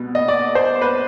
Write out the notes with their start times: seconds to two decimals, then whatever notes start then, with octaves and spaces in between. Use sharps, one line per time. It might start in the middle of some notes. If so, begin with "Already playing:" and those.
Already playing: C2 B2 B3
0.15 D#5
0.28 D5
0.55 C5
0.82 B4